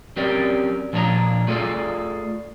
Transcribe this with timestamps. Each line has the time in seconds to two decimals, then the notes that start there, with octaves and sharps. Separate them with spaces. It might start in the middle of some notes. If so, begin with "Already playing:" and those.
0.16 F#3 C4 C#4 G4 A#4 D5
0.93 A#2 F3 A#3 D4 C#5 A#5
1.47 A3 F4 G#4 A4 D5